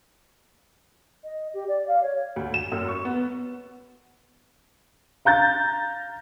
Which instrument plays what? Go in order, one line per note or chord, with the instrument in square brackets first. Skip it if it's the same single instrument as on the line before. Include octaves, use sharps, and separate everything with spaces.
[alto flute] D#5
G4
D5
F5
C#5
[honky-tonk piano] D2
E7
F#2
C#6
B3
F5 A#5 G6 A6